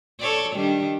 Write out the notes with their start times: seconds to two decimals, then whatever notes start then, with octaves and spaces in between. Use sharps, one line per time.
0.20 A4 C#5 D5
0.56 D#3 G3 D4